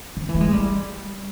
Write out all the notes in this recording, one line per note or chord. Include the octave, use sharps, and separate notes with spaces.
F3
E3
A3
G#3
G3